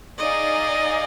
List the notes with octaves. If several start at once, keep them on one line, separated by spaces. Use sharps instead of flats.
D#4 G#4 D5 D#5 F5 G#5